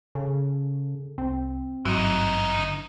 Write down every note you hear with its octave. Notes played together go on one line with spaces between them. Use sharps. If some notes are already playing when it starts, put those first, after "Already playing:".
C#3 A4
C2 C4
G#1 G2 E3 F#3 D#4
D3